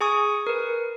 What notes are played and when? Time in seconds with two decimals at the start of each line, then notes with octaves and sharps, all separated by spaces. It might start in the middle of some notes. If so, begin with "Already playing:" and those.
0.01 G#4 G#5 C#6 D#6
0.47 A#4 B4